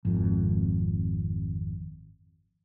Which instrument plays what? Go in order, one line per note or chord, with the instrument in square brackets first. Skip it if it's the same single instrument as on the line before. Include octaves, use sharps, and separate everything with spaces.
[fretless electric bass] G#1 F2